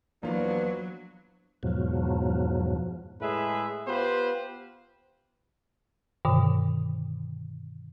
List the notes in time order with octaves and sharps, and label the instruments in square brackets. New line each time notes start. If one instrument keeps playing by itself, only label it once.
[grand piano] E2 F4 [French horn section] F3 B3 D4 [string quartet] F#3 [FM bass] A#3
[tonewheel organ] E2 G#2 B2 F3 F#3
[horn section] A2 G#3 G#4 B4 E5
B3 F4 G4 B4 C5
[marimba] G2 B2 D3 D#3 C5